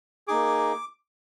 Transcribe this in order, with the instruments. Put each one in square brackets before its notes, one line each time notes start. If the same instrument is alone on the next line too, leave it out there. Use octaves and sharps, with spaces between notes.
[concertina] A#3 D#4 G#4 D6